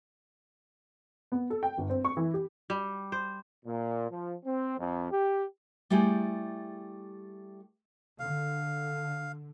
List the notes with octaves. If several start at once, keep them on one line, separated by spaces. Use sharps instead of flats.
B3
A4
G5
G1
C4
C#6
E3
G4
G3
C5
A#2
F3
C4
F2
G4
G3 A3 E4 G4 G#4
D3 F5